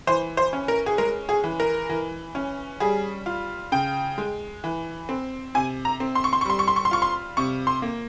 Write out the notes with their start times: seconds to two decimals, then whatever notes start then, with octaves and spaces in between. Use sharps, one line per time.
0.07 E3 C5
0.37 C5
0.53 C#4
0.68 A#4
0.86 G#4
0.98 G#3 A#4
1.29 G#4
1.44 E3
1.60 A#4
1.89 E3
2.35 C#4
2.80 G3 G#4
3.26 F4
3.72 C#3 G5
4.18 G#3
4.64 E3
5.09 C4
5.55 C3 G#5
5.85 A#5
6.00 C4
6.15 C6
6.24 C#6
6.33 C6
6.41 C#6
6.45 G3 C6
6.59 C#6
6.68 C6
6.76 C#6
6.85 C6
6.91 F4 C#6
7.02 C6
7.37 C3 C#6
7.67 C6
7.82 A#3